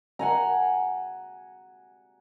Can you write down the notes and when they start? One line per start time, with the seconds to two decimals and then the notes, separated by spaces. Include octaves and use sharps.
0.19 F#5 G#5 A#5